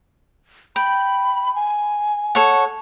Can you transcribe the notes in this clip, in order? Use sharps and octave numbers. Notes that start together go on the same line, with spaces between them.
G5 B5
G#5
A4 C#5 F#5